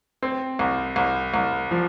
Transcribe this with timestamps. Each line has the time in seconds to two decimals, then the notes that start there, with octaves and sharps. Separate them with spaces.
0.23 C4
0.59 C2
0.96 C2
1.34 C2
1.71 F3